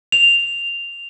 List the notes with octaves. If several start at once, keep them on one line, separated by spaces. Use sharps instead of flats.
F7